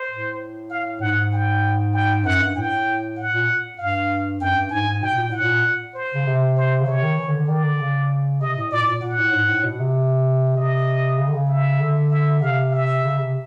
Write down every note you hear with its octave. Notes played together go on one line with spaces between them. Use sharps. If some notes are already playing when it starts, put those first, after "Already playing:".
Already playing: C5
A2
F5
G#2 F#5
G5
G5
F#2 F#5
G2
A2 G5
F#5
A#2
G2 F5
F#2 G5
G2
G#2 G#5
B2 G5
A#2
A2 F#5
A#2
C5
C#3
C3
C5
C#3
C3 C#5
D#3
E3
D3
D3
D#3 D5
D3
C#3
C3 D#5
A2
A#2 D5
A2
A#2
A#2 F#5
A2
G#2
A2
B2
C3
C3 D#5
C#3
D3
C#3
E5
D3
E5
C3 F5
E5
C#3
C3